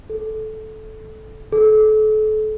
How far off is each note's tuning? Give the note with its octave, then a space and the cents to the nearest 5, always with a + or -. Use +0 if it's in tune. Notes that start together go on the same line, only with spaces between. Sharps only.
A4 -15
A4 -35